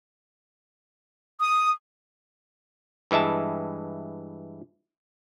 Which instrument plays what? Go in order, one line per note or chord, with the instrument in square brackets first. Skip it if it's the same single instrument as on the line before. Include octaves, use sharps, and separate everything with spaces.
[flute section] D#6
[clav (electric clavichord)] G2 E3 G#3 E5 A5